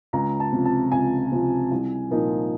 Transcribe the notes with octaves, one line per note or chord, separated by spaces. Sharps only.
C#2 A#5
A5
C3 F3
A5
C#2 G#5
C3 F3
C2
A#2 F3 A#3 D#4